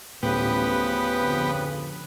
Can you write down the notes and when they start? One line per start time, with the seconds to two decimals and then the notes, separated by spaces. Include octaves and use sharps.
0.23 D1 A1 A2 C#3 F3 B3 G4 B4
1.20 F2 D3